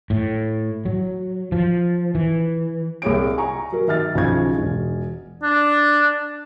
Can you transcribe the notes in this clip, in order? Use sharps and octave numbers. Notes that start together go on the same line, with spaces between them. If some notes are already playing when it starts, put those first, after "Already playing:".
A2
F#3
F3
E3
C2 G#4 C#5 D7
G#5 A#5 C#6
F#3 A#4
D#3 E5 F6 A6
B1 C#3 F3 C#6 G#6
E1
D4